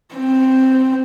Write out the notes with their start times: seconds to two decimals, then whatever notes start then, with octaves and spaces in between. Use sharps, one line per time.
0.14 C4